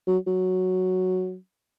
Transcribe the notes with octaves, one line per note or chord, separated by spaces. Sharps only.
F#3
F#3